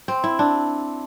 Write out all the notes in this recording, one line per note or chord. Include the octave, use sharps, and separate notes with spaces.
C4
E4
D4